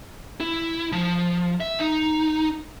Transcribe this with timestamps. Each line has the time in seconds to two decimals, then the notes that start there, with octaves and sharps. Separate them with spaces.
0.40 E4
0.92 F3
1.60 E5
1.80 D#4